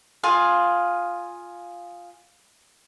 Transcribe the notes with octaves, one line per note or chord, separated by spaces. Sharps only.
F4 G#4 F5